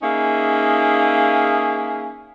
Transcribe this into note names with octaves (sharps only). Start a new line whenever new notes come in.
A#3 C#4 D#4 G#4 E5 F5